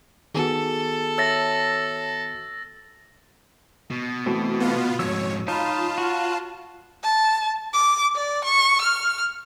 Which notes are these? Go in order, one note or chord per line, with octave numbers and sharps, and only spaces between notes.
D#3 B3 F#4 G#4 A4
C#5 E5 A5 E6 A6 A#6
B2
E3 A3 C4 F#4
B3 F4
F2 G#2 C#5 E6
D#4 F4 C#5 A5 B5
F#4
A5
D6
D5
C#6
F6